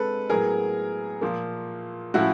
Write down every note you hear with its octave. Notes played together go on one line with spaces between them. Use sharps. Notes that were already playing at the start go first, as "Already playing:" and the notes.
Already playing: G#3 C4 A4 B4
A2 F#3 B3 G#4 A#4
A#2 F3 A#3
A2 F3 A3 C#4 E4 F#4